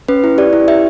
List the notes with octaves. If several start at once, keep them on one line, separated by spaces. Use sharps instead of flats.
C#4 B4
E4
G4 D5
E4
G4 E5